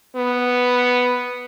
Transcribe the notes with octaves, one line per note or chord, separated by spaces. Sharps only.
B3